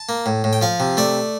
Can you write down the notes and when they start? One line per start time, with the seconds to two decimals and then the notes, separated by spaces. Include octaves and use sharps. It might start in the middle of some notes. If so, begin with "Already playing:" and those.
Already playing: A5
0.09 A#3
0.26 A2
0.44 A2
0.53 G5
0.62 F3 F5
0.80 C3
0.97 A3 D5